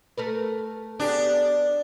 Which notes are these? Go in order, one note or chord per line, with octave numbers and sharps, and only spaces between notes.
A3 A#4 B4
B3 D4 G4 G#4